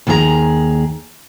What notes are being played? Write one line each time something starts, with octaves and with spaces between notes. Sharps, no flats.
D#2 D#3 G#4 A4 A#5